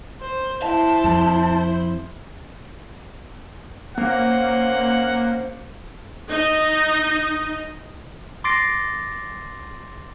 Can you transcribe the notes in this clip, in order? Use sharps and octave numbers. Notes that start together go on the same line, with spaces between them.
C5
E4 C5 A5
F2
A#3 C#4 C5 F#5
D#4 D#5
C6 D6 A6 A#6 C7 D7